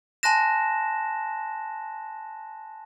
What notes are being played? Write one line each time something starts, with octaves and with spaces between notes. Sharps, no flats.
G#5 A5 C6 F#6 A#6 E7